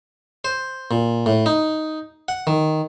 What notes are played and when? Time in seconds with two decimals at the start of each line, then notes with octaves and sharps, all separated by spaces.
0.45 C5
0.91 A#2
1.26 A2
1.46 D#4
2.28 F#5
2.47 D#3